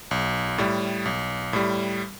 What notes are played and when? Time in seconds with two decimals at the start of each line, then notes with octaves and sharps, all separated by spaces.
0.11 B1
0.58 A2 G3
1.05 B1
1.53 A2 G3